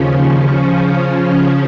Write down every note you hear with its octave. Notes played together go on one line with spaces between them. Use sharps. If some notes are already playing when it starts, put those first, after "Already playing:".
Already playing: D#2 C#3 F3 C#4
C#3 F3 C#4